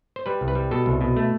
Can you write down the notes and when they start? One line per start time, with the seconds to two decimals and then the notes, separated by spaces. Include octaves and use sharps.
0.16 C5
0.26 G3 B4
0.41 C2
0.48 B4
0.55 G3
0.71 B2 A4
0.86 C2
1.01 B2
1.16 A3